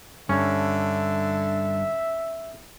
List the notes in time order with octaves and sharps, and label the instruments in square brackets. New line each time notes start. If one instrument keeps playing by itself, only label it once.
[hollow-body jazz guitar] G2 [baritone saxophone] D3 [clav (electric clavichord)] C#4 [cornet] E5